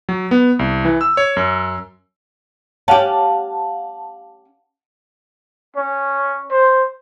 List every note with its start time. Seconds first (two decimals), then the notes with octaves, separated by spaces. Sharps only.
0.09 F#3
0.31 B3
0.59 C2
0.85 E3
1.01 E6
1.17 C#5
1.37 F#2
2.88 C#4 G4 F5 F#5 A5
5.76 C#4
6.51 C5